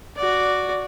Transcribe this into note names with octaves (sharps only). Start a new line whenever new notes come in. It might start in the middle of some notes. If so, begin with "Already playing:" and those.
F#4 D5